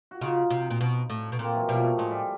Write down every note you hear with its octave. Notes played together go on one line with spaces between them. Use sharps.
F#4
C#3 D#4 F4
C3
A#2
B2
A2
B2
A#2 A#3 C4
E3 F#3
B2 F3 G3
A3
A2 G#3
G3